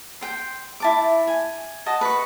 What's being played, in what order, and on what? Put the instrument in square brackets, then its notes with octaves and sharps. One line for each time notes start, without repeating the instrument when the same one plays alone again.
[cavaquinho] G5 C6
E4 A5 D6
G#5
F#4 D#5 A5
B4 C#6